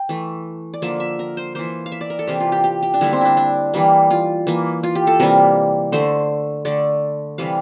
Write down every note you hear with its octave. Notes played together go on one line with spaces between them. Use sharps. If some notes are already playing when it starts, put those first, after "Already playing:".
Already playing: G5
E3 A3
D5
D3 F3 A#3 E5
E5
A#4
C5
E3 A#3 C5
F5
E5
D5
A#4
A4
C3 E3 A#3 G4
F4
G4
G4
G4
D4
D3 G3 A#3 E4
C4
D4 E4
D4
E3 G3 A#3
F4
E3 A#3
F4
G4
A4
C3 E3 G3 A#3 A#4
D3 A3 C5
D3 A3 D5
C3 E3 G3 F5